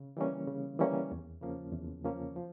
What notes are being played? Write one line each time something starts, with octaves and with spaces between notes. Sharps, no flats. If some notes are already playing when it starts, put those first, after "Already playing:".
Already playing: C#3
E3 G3 A#3 C#4
C#3
E3 G3 A#3 C#4
E2
C#3 F3 A#3 C#4
E2
C#3 F3 A#3 C#4
F3